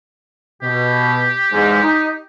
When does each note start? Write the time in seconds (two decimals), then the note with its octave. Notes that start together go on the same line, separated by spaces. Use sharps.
0.63 B2 G4
1.52 E2 G#2 G#3
1.83 D#4